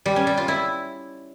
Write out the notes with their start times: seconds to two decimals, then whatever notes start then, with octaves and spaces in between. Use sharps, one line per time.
0.06 G3
0.16 C#4
0.27 G3
0.37 F4
0.48 E4